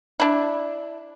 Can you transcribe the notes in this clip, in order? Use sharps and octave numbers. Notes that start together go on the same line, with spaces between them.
D4 E4